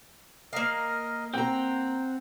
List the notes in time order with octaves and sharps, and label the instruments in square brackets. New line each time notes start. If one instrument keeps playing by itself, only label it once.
[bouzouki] A#3 F5 [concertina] A#4 D#5
[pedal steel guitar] C4 [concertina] F#5 [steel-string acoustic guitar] G5 A#5